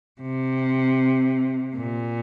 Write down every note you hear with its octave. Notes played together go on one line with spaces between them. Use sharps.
C3
A#2